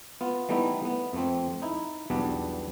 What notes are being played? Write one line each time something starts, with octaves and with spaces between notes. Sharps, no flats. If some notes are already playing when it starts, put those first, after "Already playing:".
B3 F4
E3 G3 A3 B3 D#4 E4
B3
F2 A3 C4
D#4 E4
B1 E2 G3 B3 D4